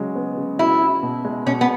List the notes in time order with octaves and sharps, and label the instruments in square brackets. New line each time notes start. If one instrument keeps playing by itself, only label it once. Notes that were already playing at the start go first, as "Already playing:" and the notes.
Already playing: [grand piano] C#3 F#3 G#3
B3
C#3
[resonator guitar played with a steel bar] E4 [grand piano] F#4
[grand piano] F#4
B2
G#3
[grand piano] B2 [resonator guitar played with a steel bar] C#4
[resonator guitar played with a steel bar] B3